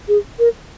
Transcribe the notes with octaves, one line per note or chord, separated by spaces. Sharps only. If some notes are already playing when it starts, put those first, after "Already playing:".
G#4
A#4